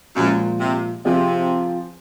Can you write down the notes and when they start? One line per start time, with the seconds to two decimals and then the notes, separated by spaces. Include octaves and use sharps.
0.15 F#2 A#2 F3 G#3
0.60 C3
1.04 C3 F3 C4 F4 G#4